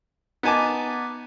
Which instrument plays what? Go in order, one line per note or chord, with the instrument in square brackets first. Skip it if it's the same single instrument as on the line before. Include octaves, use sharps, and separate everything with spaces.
[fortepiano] B3 D#4 G#5 A5 D6